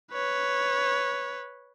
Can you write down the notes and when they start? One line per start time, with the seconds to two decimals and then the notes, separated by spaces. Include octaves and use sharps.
0.12 B4 C#5